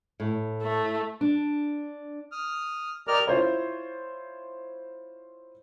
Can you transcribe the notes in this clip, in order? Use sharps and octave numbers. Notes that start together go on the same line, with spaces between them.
A2
A3
D4
D#6 F6
G4 A#4 D5 D#5 F6
E4 F4 C5 C#5